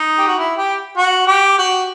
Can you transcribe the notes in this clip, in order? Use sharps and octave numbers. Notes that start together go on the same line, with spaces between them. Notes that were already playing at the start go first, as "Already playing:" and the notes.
Already playing: D#4
G4
F#4
E4
G4
F#4
G4
F#4